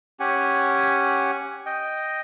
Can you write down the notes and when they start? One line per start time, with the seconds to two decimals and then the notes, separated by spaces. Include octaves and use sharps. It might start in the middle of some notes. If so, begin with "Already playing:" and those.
0.20 C#4 G4 F#5 G#5
1.66 D#5 G5